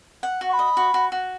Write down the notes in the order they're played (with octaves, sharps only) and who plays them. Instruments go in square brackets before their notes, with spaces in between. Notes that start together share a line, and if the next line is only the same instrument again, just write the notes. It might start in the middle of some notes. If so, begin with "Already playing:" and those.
[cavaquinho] F#5
F#4
[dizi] C#6
B5
[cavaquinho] D#5
F#4
F#4
F#4